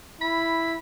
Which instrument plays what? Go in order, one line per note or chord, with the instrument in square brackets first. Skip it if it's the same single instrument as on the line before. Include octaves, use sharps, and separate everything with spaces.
[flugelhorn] E4 [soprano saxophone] B5